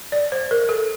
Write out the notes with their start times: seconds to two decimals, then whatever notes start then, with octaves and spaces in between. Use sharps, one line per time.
0.12 D5
0.32 C5
0.51 A#4
0.69 A4